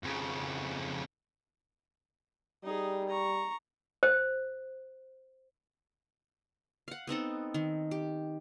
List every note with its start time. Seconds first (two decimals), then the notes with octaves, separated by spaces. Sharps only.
0.03 F2 C#3
2.64 G3 D#4 G#4
3.09 A#5 C#6
4.03 C5
6.88 F5 F#5
7.07 B3 C4 D#4 A4
7.54 D#3
7.91 G4